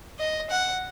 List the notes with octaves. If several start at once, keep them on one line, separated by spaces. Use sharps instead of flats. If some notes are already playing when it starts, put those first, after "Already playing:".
D#5
F#5